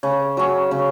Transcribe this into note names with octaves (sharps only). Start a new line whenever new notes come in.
C#3
F#3 C#4
C#3